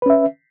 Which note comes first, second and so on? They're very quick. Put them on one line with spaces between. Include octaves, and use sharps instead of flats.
B4 C#4 E5